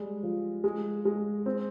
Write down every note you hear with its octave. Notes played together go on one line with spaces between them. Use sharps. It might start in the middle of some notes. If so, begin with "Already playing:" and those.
Already playing: G3 G#3
F3
G#3
G#3
C4